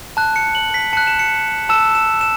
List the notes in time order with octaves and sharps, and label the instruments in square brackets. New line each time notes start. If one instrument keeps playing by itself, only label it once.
[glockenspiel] A5 F#6
C#7
F#7
B6
A5 F#6 C#7
E7
C#7
A5 E6 E7
E7
E7